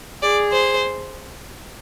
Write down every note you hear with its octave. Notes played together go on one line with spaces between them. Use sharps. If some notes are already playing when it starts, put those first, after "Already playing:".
G#4 D5
C5